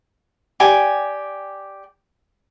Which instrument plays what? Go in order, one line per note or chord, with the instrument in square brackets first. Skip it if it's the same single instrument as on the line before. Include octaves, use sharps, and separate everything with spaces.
[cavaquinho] G4 D5 G#5 D6